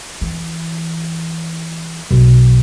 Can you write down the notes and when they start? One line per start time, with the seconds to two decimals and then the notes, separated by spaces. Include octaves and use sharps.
0.21 E3
2.11 B1